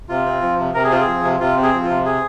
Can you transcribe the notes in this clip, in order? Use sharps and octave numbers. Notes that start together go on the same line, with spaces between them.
C3 F4
C4
F3
C3
C3 A#4
G#4
C4 F4
G#4
F3
C3
C3 F4
C4
G#4
F3
F4
C3
G#4